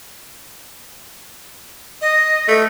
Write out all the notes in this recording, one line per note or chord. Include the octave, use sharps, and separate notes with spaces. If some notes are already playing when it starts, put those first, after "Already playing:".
D#5
A3